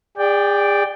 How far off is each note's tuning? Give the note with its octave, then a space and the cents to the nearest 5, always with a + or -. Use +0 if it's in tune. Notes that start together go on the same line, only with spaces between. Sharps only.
G#4 -40 D5 +0 G5 +0